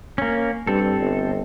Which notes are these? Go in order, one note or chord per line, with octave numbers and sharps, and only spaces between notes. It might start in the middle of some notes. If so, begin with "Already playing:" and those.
A#3 C#4
G2 C4 A4
G1